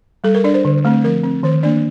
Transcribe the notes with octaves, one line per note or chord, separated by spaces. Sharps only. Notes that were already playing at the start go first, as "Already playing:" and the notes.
G3 A4
A#4
D4 D5
C5
D3
A3 C4
F3 A#4
C4
D#3 C5
A#3 D4 D5